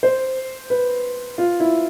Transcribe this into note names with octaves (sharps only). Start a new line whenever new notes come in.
C5
B4
F4
E4